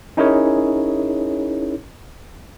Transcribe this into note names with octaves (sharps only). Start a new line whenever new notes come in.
C#4 D#4 E4 G#4 A#4 C#5